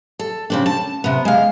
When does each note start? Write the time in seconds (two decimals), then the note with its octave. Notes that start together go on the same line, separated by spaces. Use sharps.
0.19 A4
0.50 C#3 C4 D4
0.66 A5
1.04 C3 B3
1.25 G#3 F5